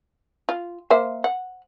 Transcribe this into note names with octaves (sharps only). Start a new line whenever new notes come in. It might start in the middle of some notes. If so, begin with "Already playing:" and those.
F4
A#3 C5 E5
F#5